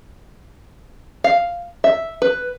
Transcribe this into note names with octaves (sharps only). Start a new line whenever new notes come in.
F5
E5
B4